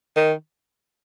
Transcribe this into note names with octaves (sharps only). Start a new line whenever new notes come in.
D#3